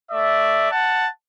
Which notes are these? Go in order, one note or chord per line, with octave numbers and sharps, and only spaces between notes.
A3 D5 E5
F#5 A5